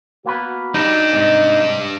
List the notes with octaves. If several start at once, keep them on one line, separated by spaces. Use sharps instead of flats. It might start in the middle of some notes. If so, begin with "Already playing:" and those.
A#3 B3 F#4 B4
G2 D4 D#4
G#2 C3 D#5